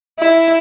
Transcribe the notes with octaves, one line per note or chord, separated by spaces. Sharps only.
E4